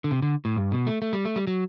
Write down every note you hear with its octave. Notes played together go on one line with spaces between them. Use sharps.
D3
C3
D3
A2
G2
B2
A3
A3
G3
A3
G3
F#3